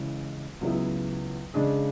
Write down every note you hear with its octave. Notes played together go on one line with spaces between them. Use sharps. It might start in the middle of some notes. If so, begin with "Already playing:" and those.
Already playing: C#3 E3 G#3 C#4
C#2 C#3 F#3 B3 E4
C#3 G#3 D4 G#4